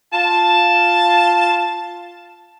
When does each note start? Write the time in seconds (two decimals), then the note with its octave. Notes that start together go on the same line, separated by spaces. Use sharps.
0.13 F4 A5